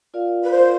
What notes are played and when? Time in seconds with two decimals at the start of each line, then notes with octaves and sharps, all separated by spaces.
0.14 F4 A#4 D5 F5
0.43 B4
0.51 F4 A#4 C5 D5 F5